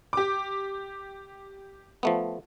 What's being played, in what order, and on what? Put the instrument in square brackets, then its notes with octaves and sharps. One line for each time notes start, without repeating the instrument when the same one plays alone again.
[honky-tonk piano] G4 D6
[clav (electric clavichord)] F3 A3 B3